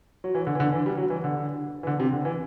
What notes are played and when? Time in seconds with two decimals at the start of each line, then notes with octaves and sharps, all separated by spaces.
0.24 F#3
0.35 E3
0.47 D3
0.55 E3
0.60 D3
0.73 E3
0.86 G3
0.97 F#3
1.10 E3
1.24 D3
1.83 E3
1.87 D3
2.00 C3
2.13 D3
2.25 E3